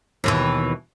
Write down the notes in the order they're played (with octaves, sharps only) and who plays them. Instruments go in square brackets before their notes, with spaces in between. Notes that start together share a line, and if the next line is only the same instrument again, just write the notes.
[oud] D#2 B2 E3